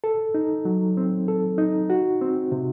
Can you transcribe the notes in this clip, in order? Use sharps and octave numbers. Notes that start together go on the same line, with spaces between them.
A4
D#4
F#3
C4
A4
D#4
F#4
C4
C3